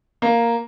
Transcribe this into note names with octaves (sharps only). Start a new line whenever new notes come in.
A#3